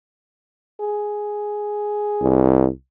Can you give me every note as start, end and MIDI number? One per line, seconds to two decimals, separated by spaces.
0.81 2.63 68
2.22 2.68 36